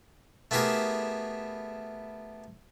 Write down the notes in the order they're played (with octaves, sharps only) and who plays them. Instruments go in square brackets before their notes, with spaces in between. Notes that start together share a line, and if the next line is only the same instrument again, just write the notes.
[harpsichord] A3 B3 E4 G4 G#4 A#4